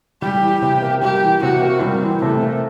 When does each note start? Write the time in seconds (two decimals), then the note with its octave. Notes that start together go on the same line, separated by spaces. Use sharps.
0.22 G3 G4
0.41 E3
0.62 C3
0.82 A#3
1.02 G3 G4
1.22 E3
1.42 C3 F#4
1.62 A#3
1.82 G3 C4
2.02 E3
2.22 C3 A3
2.42 A#3